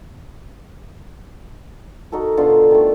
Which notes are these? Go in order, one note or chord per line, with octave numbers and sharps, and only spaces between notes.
D#4 F#4 A4 A#4
B2 D3 F4 C6
D#3 A3